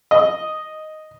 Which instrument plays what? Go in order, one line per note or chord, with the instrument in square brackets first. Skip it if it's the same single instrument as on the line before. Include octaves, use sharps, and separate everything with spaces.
[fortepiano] D#5